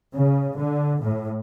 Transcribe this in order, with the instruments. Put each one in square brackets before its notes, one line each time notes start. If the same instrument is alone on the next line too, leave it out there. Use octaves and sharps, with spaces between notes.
[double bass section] C#3
D3
A2